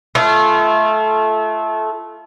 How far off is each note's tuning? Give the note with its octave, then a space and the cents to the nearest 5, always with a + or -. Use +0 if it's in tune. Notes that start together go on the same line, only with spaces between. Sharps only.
A3 -20 F4 -30